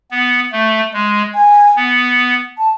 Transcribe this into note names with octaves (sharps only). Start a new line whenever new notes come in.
B3
A3
G#3
G#5
B3
A5